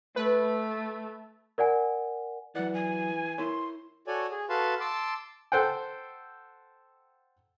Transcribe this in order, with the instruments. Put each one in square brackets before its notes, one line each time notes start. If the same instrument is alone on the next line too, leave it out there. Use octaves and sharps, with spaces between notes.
[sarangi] A3 [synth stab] B4
[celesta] A#4 D5 F#5 G#5
[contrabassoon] E3 [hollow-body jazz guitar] F#3 D5 [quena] F#5
[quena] G#5
[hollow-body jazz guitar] E4 A#4 C#5 [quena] C6
[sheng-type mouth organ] F#4 A4 C#5 D5 G#5
G#4
F#4 A4 B4 F5 A5 C6
A5 C6 D6 E6
[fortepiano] A4 C5 F#5 G5